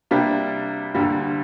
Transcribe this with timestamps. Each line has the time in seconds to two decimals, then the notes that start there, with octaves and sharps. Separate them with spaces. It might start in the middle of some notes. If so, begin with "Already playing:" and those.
0.11 C3 G3 A#3 D4
0.94 D2 D3 G3 A#3